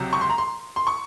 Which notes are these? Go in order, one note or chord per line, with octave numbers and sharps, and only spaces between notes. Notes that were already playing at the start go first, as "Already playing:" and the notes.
Already playing: C#2 C3 F#3
C#6
C6
A#5
C6
C6
C#6